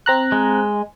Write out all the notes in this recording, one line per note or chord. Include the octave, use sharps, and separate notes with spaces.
C4 A#5 F#6
G#3